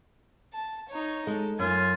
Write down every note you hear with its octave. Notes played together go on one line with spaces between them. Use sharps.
A5
D#4 C#5
G#3 A4
F#2 F4 G#5